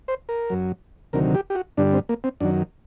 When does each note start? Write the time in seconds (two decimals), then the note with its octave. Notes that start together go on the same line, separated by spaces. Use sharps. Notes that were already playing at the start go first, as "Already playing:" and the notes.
0.08 C5
0.29 A#4
0.50 F#2 F#3
1.13 D2 C3 D#3 F#3 A#4
1.34 G4
1.50 G4
1.55 F#4
1.77 G2 D3 G3 D4
1.93 C4
2.09 A#3
2.24 C4
2.40 F#2 D#3 F#3 D4